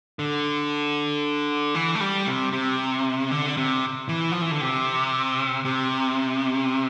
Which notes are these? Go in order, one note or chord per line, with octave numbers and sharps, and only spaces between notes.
D3
E3
A3
G3
C3
C3
D3
C3
E3
F3
E3
D3
C3
C3